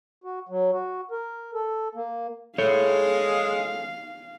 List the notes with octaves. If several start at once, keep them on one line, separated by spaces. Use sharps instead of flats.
F#4
F#3
F#4
A#4
A4
A#3
G#3 A4 C#5 F5